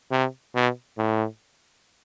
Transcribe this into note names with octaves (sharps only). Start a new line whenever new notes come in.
C3
B2
A2